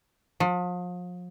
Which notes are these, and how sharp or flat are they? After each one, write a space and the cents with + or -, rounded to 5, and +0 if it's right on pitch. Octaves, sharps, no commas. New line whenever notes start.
F3 +40